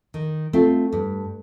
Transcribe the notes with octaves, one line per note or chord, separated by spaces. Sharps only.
D#3
A3 C4 F4
G2